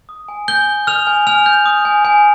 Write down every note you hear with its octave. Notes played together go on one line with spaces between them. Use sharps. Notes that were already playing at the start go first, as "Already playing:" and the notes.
D#6
G#5
G#5 G6 G7
G6
D#6 F6 F7
G#5
G#5 F6 F7
G6
D#6
G#5
G#5